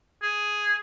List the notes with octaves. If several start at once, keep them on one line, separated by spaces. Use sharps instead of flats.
G#4